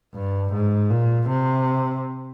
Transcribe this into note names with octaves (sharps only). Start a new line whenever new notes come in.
G2
G#2
A#2
C3